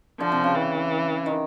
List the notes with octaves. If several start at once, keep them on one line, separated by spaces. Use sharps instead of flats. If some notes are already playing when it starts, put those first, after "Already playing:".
D3 F3
C3
C#3
E3
D#3